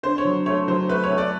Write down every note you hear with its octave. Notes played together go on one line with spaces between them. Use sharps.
D3 C5
C#5
F#3
A3 C#5
F#3 C5
A3 B4
C#5
A3
D5